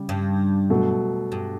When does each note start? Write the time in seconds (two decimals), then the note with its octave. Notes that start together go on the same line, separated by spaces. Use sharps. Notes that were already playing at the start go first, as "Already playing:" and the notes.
Already playing: C#3 G3
0.09 G2
0.70 B2 F#3 A3
1.32 G2